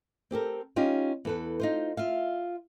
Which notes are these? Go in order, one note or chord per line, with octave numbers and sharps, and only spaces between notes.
C4 G4 A4 A#4
C#4 D#4 F4 G4
E2 A4 B4
D#4 F4 C5
F4 E5 F5